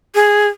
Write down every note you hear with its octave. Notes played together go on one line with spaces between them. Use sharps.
G#4